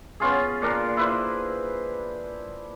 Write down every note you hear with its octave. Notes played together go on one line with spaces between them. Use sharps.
B3 C#4 F4 G#4
A#2 D4 A#4
E4 B4 C5